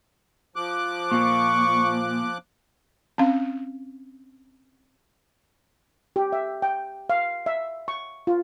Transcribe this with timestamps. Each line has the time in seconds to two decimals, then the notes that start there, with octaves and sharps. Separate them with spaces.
0.56 F3 D6 F#6
1.12 A#2 C#6
3.18 C4 C#4 F5
6.16 G4
6.33 E5
6.62 G5
7.10 F5
7.46 E5
7.88 C#6
8.27 F4